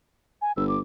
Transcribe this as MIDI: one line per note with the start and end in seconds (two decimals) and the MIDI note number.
0.42 0.52 80
0.57 0.80 31
0.57 0.67 88
0.68 0.80 86